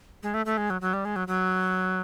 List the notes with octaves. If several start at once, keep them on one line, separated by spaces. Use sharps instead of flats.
G#3
A3
A3
G#3
F#3
F#3
G3
G#3
F#3
F#3